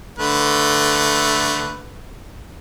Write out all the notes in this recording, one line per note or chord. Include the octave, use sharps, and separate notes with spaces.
D3 A3 B4